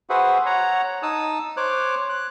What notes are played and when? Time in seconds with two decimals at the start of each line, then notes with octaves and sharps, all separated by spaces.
0.09 F#4 G#4 B4 C5 E5 F#5
0.46 C#5 F#5 A#5
1.03 D#4 A5 D#6 E6
1.57 C5 C#5 D6 F#6
2.09 F#6